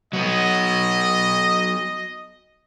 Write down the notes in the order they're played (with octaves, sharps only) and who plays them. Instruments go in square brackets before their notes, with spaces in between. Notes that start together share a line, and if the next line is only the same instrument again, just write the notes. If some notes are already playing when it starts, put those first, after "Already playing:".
[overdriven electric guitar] F#3 B3 [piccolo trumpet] D#5